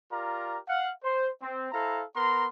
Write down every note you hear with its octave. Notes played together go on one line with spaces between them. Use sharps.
F4 G4 A#4 D5 A#5
F5 F#5
C5
C4
E4 A4 C5 F5 A#5
B3 A#4 A#5 C6